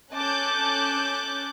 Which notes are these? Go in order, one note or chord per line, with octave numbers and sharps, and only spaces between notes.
C#4 A4 A5 D6 F#6 G6